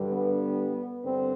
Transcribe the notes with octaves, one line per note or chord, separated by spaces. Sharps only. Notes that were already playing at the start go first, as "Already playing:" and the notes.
Already playing: G2 D3 G3
B3
G2 D3 C4